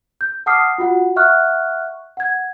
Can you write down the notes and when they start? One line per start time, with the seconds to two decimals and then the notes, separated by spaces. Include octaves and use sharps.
0.21 G6
0.46 F#5 A5 D6 D#6 F6 C7
0.78 F4 F#4 F#5
1.16 E5 F#5 C#6 F6 F#6
2.17 F#5 G#6